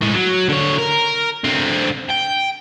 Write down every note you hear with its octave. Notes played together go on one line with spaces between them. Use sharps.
A2 G#3
F#3
D3 C#5
A#4
D3 C4
G5